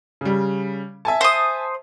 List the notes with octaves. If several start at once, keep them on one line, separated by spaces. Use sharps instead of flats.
C#3 G3
E5 G#5 A5
C5 D#6